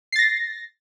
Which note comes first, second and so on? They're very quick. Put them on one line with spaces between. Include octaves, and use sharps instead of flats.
C7 A6 A#6